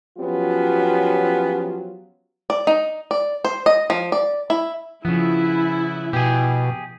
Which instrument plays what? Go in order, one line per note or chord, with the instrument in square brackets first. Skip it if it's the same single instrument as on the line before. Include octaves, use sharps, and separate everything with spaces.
[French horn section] F3 F#3 B3 C#4 F4 G4
[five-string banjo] D5
D#4
D5
C5
D#5
F3
D5
E4
[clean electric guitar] C#3 B3 [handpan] F3 [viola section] E4
[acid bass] B2 [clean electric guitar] G4 G#4